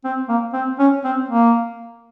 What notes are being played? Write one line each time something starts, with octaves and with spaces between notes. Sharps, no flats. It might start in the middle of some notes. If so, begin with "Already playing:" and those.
C4
A#3
C4
C#4
C4
A#3